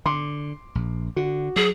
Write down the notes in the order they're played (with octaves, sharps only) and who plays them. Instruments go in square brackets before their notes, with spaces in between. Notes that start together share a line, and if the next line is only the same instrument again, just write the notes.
[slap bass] D3 [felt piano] C6 D6
[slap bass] A#1
[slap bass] D3 [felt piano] F#4
[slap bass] F#3 [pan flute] G#4